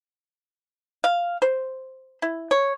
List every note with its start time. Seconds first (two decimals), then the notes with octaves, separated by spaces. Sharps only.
1.04 F5
1.42 C5
2.22 E4
2.51 C#5